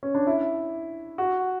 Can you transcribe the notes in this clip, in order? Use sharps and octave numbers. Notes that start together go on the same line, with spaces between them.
C#4
D4
E4
F#4